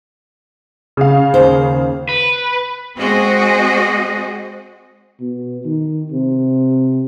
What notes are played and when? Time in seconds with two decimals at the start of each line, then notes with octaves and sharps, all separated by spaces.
0.97 C#3 F5
1.34 D#2 C5
2.09 B4
2.96 G#3 C4 F#4 G#4 D#5
5.20 B2
5.65 D#3
6.12 C3